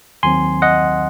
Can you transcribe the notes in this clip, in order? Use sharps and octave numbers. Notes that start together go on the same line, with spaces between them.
D#2 D#3 F#3 C4 G#5 C6
D#5 F#5